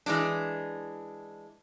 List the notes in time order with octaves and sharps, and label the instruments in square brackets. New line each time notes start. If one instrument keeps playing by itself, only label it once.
[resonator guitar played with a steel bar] E3 G#3 D4